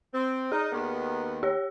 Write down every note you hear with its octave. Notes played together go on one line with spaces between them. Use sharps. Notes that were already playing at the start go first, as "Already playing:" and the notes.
C4
D#4 G#4
D#2 D#3 B3
G4 C#5